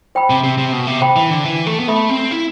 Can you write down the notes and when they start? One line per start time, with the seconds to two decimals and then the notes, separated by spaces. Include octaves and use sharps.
0.15 C5 G5 B5
0.30 C3
0.44 C3
0.58 C3
0.73 B2
0.87 C3
1.01 C5 G5 B5
1.16 E3
1.30 D3
1.45 E3
1.66 A3
1.79 B3
1.88 A3 A4 E5 B5
2.10 C4
2.31 E4